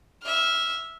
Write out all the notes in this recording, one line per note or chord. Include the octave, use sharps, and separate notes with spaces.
E5 F6